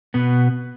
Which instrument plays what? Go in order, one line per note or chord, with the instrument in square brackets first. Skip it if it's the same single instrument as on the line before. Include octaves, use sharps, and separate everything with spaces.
[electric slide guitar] B2 B3